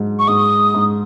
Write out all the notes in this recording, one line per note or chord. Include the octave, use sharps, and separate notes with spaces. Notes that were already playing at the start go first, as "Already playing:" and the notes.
Already playing: G#2 F#3
C#6
G#2 D#6
G#2